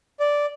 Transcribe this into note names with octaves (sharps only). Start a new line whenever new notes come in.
D5